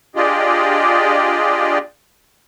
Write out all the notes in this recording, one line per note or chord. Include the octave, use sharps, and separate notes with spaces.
D4 F4 G4 G#4 D5 D#5